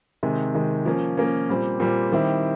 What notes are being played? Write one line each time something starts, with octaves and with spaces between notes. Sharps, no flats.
C3 D#3 G#3
C3 D#3 G#3
F3 A#3 C#4
F3 A#3 C#4
A#2 G3 C4
A#2 G3 C4
D#3 G3 C4 E4 G4